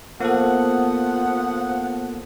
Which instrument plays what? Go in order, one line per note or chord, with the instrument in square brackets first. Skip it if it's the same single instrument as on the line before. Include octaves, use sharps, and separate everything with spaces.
[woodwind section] F3 B3 [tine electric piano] A#3 A4 [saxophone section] F#5